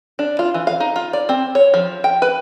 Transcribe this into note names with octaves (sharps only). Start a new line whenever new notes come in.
D4
F4
E3
F5
D#4
F4
D5
C4
C#5
F3
G5
B4